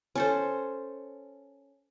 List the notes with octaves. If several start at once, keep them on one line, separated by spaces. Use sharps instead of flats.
C#4 A4 C5